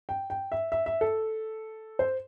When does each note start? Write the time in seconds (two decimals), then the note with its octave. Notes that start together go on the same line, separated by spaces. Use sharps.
0.09 G5
0.30 G5
0.52 E5
0.72 E5
0.86 E5
1.01 A4
1.99 C5